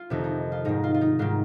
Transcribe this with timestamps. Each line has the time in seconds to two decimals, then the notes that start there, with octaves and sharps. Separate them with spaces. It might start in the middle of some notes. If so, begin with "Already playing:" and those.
Already playing: F4
0.10 F2 C3 D#3 D#4
0.24 D#4
0.52 F4
0.65 G#2 D#3 D#4
0.84 F4
0.94 F4
1.01 D#4
1.19 G#2 D#3 F4